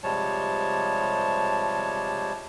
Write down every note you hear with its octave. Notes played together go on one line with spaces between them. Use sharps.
C3 F3 G3 G#3 C#5 A5